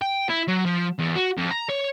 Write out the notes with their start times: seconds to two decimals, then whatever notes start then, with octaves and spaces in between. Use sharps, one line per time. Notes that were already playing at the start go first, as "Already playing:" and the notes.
0.02 G5
0.30 E4
0.48 F#3
0.66 F3
0.99 E2
1.15 F#4
1.38 F2
1.51 A#5
1.70 C#5